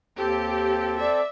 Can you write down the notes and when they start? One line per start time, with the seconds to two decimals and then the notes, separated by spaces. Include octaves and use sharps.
0.18 D#2 C4 G4 A4
1.00 D5 E5